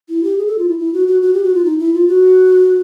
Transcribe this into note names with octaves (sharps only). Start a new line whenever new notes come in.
E4
G4
G#4
A4
F4
E4
E4
F#4
F#4
F#4
G4
F#4
F4
D#4
E4
F4
F#4